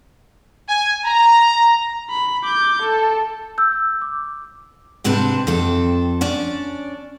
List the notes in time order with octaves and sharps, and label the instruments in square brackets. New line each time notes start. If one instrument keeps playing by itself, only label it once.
[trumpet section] G#5
A#5
[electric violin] B5
D6 G6
A4
[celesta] E6 G6
D6
[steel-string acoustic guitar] G#2 C3 C4 D4 B4 A5
F2 C4 A4
C#4 D4 D5